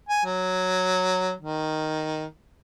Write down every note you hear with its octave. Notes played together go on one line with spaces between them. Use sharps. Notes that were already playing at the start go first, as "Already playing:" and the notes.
G#5
F#3
D#3